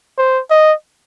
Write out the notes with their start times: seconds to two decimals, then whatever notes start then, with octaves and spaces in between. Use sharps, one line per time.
0.18 C5
0.50 D#5